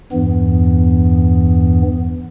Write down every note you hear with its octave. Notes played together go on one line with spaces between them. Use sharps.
E2 G2 E3 B3